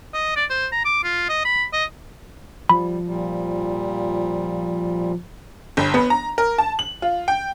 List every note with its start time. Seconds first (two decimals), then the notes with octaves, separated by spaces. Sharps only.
0.14 D#5
0.36 D5
0.50 C5
0.72 A#5
0.85 D6
1.04 F4
1.29 D#5
1.45 B5
1.73 D#5
2.69 F3 G3 B5
3.06 A#2 G3
5.77 G1
5.94 B3
6.10 A#5
6.38 A#4
6.58 A5
6.79 F#7
7.02 F4
7.28 G5